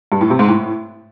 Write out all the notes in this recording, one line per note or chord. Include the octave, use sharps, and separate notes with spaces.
G2
A2
C3
G#2
A2